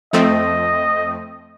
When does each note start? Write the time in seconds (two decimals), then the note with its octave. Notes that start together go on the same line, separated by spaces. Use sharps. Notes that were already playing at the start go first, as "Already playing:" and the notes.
0.13 F2 A3 C4 D#5